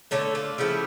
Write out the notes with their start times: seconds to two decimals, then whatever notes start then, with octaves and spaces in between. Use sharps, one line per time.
0.11 D3 A3 A4 C#5
0.35 D4 F4
0.58 C#3 F3 A3 E4 G4